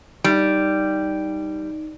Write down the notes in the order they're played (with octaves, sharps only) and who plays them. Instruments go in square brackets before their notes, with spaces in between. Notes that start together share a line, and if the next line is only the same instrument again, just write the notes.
[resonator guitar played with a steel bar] G3 [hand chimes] D#4 D7